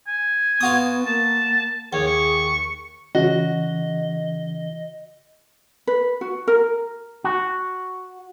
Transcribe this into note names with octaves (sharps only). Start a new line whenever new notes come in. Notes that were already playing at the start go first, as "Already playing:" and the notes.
G#5
B3 F4 F#4 D#6
A#3 A5
D#2 G#4 C#5
C#6
C#3 E3 F#4 D#5
B4
F#4
A#4
F#4